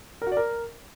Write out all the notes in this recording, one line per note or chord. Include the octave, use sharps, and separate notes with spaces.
A#4
F#4
D5
A#4